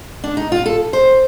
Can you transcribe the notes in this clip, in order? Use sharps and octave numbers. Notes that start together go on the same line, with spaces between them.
D4
D#4
F4
A4
C5